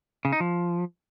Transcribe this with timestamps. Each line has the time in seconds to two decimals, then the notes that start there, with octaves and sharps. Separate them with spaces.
0.25 C#3
0.33 D#4
0.40 F3